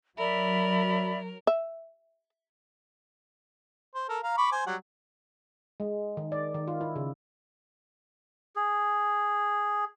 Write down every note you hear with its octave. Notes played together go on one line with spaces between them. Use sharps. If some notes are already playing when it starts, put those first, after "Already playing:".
F#3 A#4 D5 E5 B5
E5
C5
A4 A#4
F5 A#5
B5 C#6 D6
C5 G#5
F#3 G3 F#5
G#3
D#3
D5
D#3
F4
E4
C#3
G#4